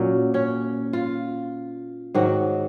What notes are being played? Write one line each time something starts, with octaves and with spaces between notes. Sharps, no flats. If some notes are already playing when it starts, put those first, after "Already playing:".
Already playing: A#2 F#3 C#4
C#4
F4
G#2 D#3 F#3 F#4